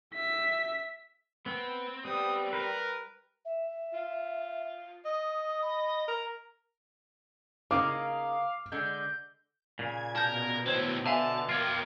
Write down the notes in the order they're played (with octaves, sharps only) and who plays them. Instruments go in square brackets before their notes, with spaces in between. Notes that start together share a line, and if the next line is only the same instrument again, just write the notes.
[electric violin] E5 B6
[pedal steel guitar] B3 [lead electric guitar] C4
[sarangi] G3 [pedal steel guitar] B3 [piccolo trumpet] D#6
[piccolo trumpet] A#4 [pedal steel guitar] B4
[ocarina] E5
[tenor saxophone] F4
[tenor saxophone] D#5 [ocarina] D#6
[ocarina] B5
[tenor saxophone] A#4 [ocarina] A#5
[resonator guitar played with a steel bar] C#3 A#3 D#4 [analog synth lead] F5 [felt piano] D6
[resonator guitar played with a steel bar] D3 G#3 [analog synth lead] G6
[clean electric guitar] A#2 C#3 [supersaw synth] G#6
[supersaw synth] B2 [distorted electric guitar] A#4 [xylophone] A5 G6
[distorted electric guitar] A2 C4 [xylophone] C5 C#5 E7
[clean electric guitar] D3 [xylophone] E5 F5 G#5 [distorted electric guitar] A5
[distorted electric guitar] A#3 C#5 [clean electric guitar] F4 [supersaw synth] A#4 G5